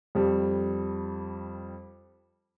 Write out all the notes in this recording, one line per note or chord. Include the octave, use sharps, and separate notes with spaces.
F2 G3